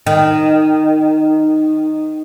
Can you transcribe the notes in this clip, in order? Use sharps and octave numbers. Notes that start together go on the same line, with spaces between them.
D#3